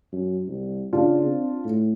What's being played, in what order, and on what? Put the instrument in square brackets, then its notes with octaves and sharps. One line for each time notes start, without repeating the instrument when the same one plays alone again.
[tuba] F#2
C2
[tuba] C#3 [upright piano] D4 F4
[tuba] C4
A2